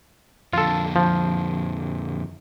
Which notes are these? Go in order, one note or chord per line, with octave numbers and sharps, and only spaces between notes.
F2 D3 F4 A4
F3